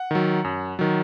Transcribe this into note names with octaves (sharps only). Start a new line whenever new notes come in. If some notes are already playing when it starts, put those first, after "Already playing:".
Already playing: F#5
D#3 F#3
F#2
D#3 F#3